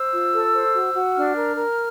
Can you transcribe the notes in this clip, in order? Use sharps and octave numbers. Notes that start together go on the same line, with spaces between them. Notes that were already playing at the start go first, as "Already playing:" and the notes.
Already playing: C5 E6
F4
A4
C5
F#4
F#4
D4 F6
A#4
A#4